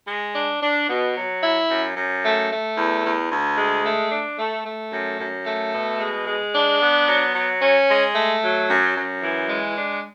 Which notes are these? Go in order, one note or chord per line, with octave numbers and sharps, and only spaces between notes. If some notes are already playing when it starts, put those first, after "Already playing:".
G#3
D4
D4
B2
F#3
E4
F#2
F#2
A3
A3
E2
E2
D2
G#3
A3
D4
A3
A3
F#2
F#2
A3
B2
G#3
G#3
D4
B3
F#3
F#3
C#4
G#3
A3
F#3
F#2
F#2
E3
G#3
D4